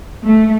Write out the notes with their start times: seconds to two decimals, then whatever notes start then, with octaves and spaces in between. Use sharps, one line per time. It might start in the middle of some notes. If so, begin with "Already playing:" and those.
0.24 A3